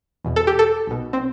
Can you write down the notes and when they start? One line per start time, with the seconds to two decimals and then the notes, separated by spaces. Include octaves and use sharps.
0.25 E2 B2
0.36 A4
0.47 G4
0.59 A4
0.87 B1 B2
1.13 C4